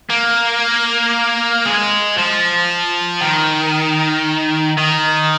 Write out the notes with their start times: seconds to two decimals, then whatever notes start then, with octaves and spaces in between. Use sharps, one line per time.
0.10 A#3
1.66 G#3
2.18 F3
3.21 D#3
4.77 D#3